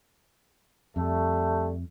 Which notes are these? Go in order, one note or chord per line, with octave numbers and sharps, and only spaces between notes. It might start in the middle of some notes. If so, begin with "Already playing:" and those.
F2 G3 A3